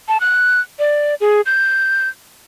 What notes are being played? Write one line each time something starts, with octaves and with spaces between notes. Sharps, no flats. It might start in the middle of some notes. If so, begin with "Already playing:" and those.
A5
F#6
D5
G#4
G6